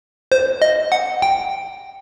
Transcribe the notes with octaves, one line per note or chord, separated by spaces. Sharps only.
C5
D#5
F#5
G5